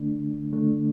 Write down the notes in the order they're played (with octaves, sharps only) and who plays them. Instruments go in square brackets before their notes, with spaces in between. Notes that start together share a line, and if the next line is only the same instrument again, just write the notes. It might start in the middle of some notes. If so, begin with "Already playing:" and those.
Already playing: [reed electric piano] D3 A3 D4
D3 A3 D4